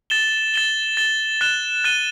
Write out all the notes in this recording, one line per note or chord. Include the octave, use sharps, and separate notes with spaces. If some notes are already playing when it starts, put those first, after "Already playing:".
A6 E7 G7
A6 E7 G7
A6 E7 G7
F#6 A6 E7 G7
F#6 A6 D#7 G7